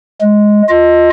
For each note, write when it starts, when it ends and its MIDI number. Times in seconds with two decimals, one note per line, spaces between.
0.21 0.62 56
0.69 1.10 65
0.69 1.10 75